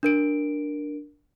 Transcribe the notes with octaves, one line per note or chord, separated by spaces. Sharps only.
D4 A#4 D7